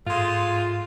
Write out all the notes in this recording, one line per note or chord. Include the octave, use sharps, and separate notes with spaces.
G#2 G#3 A3 F4 F5 C6